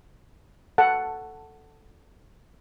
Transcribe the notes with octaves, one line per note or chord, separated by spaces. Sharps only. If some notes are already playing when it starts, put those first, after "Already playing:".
A4 F#5 A5